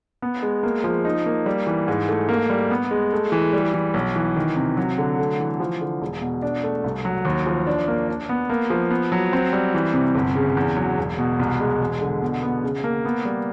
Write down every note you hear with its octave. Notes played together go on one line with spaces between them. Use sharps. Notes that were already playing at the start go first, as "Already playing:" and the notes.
B3
G#3
A#3
F3
D#4
A#3
G3
E3
G#2
A3
A#3
G3
B3
G#3
A3
E3
G3
E3
B1
E3
D#3
C3
F#3
D3
A3
E3
F3
D3
E1
B2
D4
A3
C2
F#3
D#2
F3
D4
A#3
D4
B3
A#3
F3
B3
F#3
C4
G3
E3
C3
G1
C#3
E2
F#3
E1
B2
C2
G#3
E1
D3
B2
B3
C#3
A#3
B3
G3